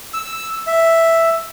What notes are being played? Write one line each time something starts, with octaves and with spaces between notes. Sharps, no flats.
E6
E5